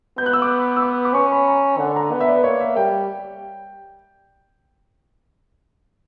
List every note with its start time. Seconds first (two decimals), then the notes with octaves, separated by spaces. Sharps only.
0.18 B3 G6
0.26 F#6
0.33 E6
0.42 D6
0.76 E6
0.82 D6
1.05 D6
1.14 C#4 C#6
1.31 B5
1.48 A#5
1.79 D3 F#5
1.96 A#5
2.12 B3 F#5
2.20 E5
2.29 D5
2.36 B4
2.44 A#3 C#5
2.60 E5
2.76 G3 G5